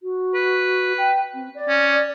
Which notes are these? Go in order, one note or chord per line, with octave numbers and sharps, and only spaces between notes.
F#4
B4
G5
C4
D5
C#4